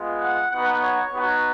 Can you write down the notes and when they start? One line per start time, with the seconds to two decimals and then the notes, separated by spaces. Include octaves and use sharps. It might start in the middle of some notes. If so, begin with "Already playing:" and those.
Already playing: G#3 B3 F4
0.20 F#5
0.51 B3 D#4 F#4 F#5
0.82 C#5
1.14 B3 D#4 F#4